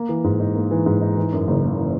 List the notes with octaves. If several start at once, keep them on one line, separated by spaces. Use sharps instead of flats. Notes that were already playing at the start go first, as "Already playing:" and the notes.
Already playing: A#3
E3
G#2
D#4
A#3
E3
G#2
D#4
E3
F#2
F#1
A#3
E3